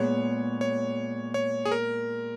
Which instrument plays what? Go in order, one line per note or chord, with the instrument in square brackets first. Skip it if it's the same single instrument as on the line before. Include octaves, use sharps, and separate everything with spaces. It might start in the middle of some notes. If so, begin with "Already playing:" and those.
Already playing: [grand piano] A#2 G#3 B3 [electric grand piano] C#5
[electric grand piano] C#5
C#5
G#4
A#4